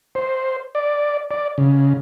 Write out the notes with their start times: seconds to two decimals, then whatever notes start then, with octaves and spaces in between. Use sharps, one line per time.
0.15 C5
0.75 D5
1.31 D5
1.58 C#3